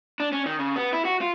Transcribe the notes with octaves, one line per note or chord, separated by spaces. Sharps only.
D4
C#4
D#3
C#3
B3
E4
F#4
F4